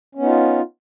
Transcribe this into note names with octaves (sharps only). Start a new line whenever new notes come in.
B3 C#4 D#4 F4